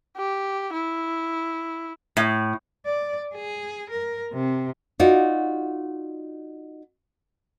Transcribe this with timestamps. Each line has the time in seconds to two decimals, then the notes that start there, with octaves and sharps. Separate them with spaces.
0.17 G4
0.73 E4
2.17 A2
2.86 D5
3.34 G#4
3.90 A#4
4.33 C3
4.99 D#4 F4 F#4 D5